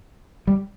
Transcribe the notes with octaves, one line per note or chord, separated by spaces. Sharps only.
G3